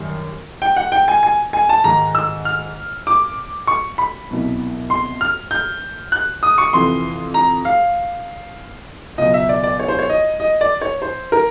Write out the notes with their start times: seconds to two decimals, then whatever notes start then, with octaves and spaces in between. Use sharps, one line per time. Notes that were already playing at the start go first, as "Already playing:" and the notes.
Already playing: F#2 D#3 G3
0.62 G5
0.77 F#5
0.92 G5
1.08 G#5
1.23 G#5
1.53 G#5
1.69 A5
1.84 G#2 D#3 G#3 A#5
2.15 E6
2.45 F6
3.07 D6
3.67 C#6
3.98 B5
4.29 C2 B2 F#3
4.90 C6
5.21 F6
5.51 G6
6.12 F#6
6.43 D#6
6.58 C#6
6.73 F2 C3 E3 C6
7.34 A#5
7.65 F5
9.18 C#2 B2 F#3 D#5
9.34 E5
9.49 D5
9.63 D5
9.80 C#5
9.88 C5
9.99 C#5
10.10 D#5
10.40 D#5
10.61 D5
10.82 C#5
11.02 C5
11.32 A#4